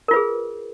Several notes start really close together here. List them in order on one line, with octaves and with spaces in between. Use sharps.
A#4 F4 B4 G#4